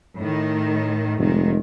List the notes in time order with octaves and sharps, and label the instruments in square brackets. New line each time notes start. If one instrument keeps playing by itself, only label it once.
[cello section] A2 D#3
[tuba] F1 [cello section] D#3 G#3